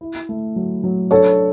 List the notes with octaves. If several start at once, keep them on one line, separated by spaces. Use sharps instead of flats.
E4
A3
F#3
F#3
D4 A4 C#5